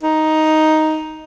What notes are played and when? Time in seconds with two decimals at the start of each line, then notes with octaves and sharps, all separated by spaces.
0.03 D#4